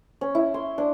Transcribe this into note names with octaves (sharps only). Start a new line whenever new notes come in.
C#4
E4
C6
D4